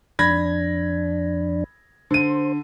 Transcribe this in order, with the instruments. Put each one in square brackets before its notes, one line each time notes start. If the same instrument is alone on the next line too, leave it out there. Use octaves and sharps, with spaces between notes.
[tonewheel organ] F2 D4 [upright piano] B5 G#6 A#6
[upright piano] D3 D#7 [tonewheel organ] C5